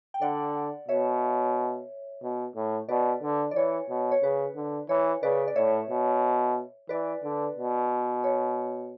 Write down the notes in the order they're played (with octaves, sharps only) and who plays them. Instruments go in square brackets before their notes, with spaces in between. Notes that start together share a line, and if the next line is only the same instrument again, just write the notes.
[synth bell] G5
[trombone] D3 [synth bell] D5 F#5
[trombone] B2 [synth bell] C#5 E5
[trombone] B2
A2
[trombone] B2 [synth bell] B4 D5
[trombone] D3
[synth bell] D5
[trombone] E3 [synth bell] C#5
[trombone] B2
[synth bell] C#5
[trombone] C#3 [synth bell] B4
[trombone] D3
[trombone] E3 [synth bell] C#5
[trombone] C#3 [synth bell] B4 D5
[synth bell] D5
[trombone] A2 [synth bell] C#5 E5
[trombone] B2
[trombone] E3 [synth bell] B4 D5
[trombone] D3
B2
[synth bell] C#5